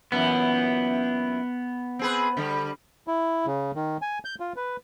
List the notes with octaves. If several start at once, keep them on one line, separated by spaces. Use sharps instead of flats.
F#2 A#2 E3 B3
C4 G#4 B4
D3 G3
E4
C#3
D#3
G#5
G6
F4
B4